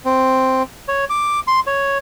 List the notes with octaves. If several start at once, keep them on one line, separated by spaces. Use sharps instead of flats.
C4
C#5
D6
C6
C#5